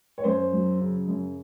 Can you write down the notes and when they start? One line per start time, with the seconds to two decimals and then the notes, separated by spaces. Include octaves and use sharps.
0.18 C#5
0.24 F#2 C5
0.53 F#3
0.80 C#3
1.08 F#2